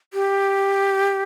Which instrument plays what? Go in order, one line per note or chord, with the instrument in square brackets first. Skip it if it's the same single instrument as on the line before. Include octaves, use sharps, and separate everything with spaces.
[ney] G4